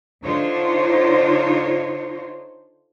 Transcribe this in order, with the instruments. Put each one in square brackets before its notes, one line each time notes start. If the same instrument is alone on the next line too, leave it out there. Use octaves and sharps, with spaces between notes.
[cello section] D3 D4 D#4 F4 C5 C#5